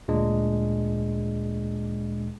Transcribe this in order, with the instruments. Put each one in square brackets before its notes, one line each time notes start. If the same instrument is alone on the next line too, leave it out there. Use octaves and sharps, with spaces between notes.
[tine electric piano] D2 A#2 G#3 D4